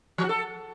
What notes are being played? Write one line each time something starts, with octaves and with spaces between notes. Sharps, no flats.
F3
F#4
A4